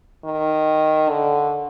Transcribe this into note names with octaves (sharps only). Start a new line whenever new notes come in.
D#3
D3